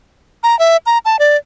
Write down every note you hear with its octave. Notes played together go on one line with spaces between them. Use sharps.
A#5
E5
A#5
A5
D5